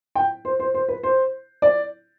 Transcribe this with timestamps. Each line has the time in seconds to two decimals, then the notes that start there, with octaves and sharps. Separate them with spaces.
0.15 G5
0.45 C5
0.60 C5
0.74 C5
0.88 B4
1.03 C5
1.62 D5